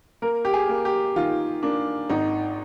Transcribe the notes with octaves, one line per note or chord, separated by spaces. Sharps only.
A#3 A#4
G4
G#4
A#3
G4
D#3 F4
A#3 D4
G#1 D#4